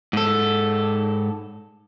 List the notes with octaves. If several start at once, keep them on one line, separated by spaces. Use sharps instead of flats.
G#2 A4